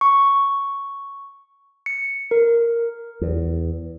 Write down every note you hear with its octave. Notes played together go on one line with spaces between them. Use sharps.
C#6
C#7
A#4
E2